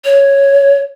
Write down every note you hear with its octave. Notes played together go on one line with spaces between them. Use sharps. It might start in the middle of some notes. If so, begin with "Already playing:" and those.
C#5